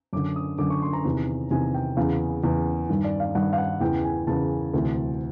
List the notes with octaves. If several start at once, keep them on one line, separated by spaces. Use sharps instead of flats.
F#2 D3 D6
D#6
F#2 D3 D6
C#6
C6
A#5
E2 C3 D#3
E2 C3 D#3 G#5
G5
E2 C#3 E3 F5
E2 C#3 E3
G2 D#3
D5
F5
G2 D#3 F#5
F5
F#5
E2 C#3 E3 G5
G#5
E2 C#3 E3 A5
D2 C3 E3